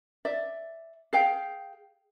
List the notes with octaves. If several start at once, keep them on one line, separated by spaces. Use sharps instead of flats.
D5 E5
G#4 F5 G5